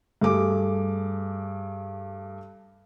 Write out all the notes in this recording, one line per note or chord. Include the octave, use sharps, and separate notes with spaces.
G2 A3 G#4 D6